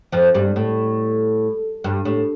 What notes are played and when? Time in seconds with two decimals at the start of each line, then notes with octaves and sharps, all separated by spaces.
0.12 F2 F3
0.35 G2 G3
0.56 A2
1.84 G2
2.05 A2